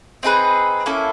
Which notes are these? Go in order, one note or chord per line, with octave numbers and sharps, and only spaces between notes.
C4 D#4 G#4 B4
A#3 C#4 E4 A4